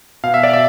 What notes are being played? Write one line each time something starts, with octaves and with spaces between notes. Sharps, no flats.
B2 F5
E5
D5
E5